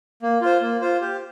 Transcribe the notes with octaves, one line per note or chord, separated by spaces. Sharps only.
A#3
F4 C5
A#3
F4 C5
G4